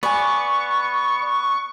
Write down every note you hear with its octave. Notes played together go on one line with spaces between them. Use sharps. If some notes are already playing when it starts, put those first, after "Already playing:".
B3 D5 G#5 C#6